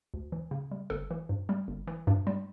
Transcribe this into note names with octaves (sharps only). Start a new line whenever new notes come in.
D2
E3
C#3
G3
G1 A4
E3
G2
G3
G1
E3
G2
G3